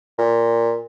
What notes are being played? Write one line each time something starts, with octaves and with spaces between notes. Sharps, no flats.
A#2